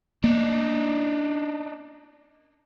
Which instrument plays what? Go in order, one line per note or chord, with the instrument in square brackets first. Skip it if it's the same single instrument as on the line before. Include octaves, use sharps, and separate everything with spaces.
[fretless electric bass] A#3 [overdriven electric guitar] D4 D#4